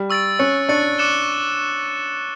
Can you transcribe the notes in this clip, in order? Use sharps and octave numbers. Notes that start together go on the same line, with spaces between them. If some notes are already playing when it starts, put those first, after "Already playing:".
Already playing: G3
C#6 E6 A6 D7
C#4 C#6 F#6 A6 C#7
D4 C#6 F#6 A6 C#7
D6 F#6 C#7 E7 G7